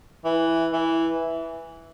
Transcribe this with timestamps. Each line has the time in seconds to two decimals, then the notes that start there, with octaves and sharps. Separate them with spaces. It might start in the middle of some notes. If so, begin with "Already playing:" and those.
0.25 E3
0.73 E3